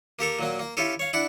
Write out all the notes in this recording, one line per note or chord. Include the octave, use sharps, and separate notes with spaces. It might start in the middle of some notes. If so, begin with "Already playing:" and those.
A#3 G4 A4 A#4
A#2 F#3 A#3
A#3
C#4 E4 F4 G4 A4
C#5 F5
D4 E4 F#5